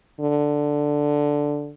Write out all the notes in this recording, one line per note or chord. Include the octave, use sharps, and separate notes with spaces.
D3